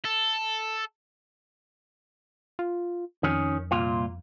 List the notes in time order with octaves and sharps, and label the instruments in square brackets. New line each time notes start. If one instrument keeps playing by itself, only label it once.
[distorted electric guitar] A4
[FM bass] F4
[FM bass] F2 [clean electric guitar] D#3 C#4
[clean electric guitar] C2 A#2 F4